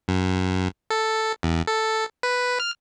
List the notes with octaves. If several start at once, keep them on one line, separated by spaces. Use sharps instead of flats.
F#2
A4
E2
A4
B4
F6